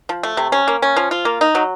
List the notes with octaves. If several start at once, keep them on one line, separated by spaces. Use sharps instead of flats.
F3
A3
C3
C#4
A#3
C#4
F3
F4
A#3
D#4
F#3